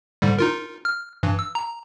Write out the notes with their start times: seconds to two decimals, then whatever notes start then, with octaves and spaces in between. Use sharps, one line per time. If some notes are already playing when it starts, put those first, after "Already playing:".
0.22 G#2 D3 G3
0.39 D#4 F4 A#4
0.85 F6
1.23 G2 E3
1.39 E6
1.55 A#5